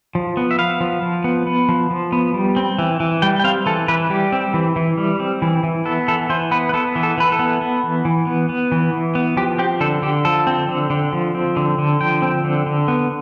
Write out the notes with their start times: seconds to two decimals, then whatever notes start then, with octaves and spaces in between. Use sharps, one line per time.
0.15 F3
0.37 B3
0.51 E5
0.59 B3 F5
0.81 F3
1.02 F3
1.24 B3
1.47 B3
1.69 F3
1.91 F3
2.12 B3
2.34 G3
2.56 C4
2.79 E3
3.00 E3
3.22 G3 G5
3.40 G5
3.44 C4 F5
3.66 E3 A4
3.88 E3 B4
4.10 G3 G4
4.32 C4
4.54 E3
4.76 E3
4.98 G3
5.20 C4
5.42 E3
5.63 E3
5.85 B3 A4
6.08 E3 A4
6.30 E3 C5
6.51 B3 B4
6.69 B4
6.74 B3 A4
6.96 E3
7.03 A4
7.18 E3 B4
7.32 A4
7.39 B3
7.61 B3
7.84 E3
8.05 E3
8.27 B3
8.49 B3
8.72 E3
8.93 E3
9.15 B3
9.37 F3 G4
9.59 C4 G4
9.80 D3 A4
10.02 D3 G4
10.25 F3 A4
10.47 C4
10.69 D3
10.90 D3
11.13 F3
11.35 C4
11.56 D3
11.79 D3
12.00 F3 G5
12.22 C4
12.44 D3
12.66 D3
12.88 B3